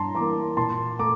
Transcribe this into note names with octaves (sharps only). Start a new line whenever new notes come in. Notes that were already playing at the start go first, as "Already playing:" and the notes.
Already playing: G2 A5 A#5 C6
E3 A#3 A#5 D6
A#2 A5 C6
A3 A#5 D6